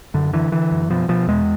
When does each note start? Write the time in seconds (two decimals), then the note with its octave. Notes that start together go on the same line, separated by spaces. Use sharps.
0.14 F#2 D3
0.33 D3 E3
0.52 D3 E3
0.72 F#2
0.90 B2 F3
1.08 B2 F3
1.28 E2 G#3